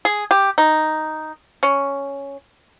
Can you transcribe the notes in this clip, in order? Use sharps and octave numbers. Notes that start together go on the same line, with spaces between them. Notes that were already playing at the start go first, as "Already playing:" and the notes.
G#4
G4
D#4
C#4